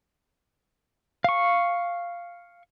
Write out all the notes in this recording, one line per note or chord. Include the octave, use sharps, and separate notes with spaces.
F5 C#6